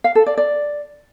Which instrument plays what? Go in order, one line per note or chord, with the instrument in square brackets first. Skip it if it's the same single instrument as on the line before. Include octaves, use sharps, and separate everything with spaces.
[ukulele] F5
A4
D5
D5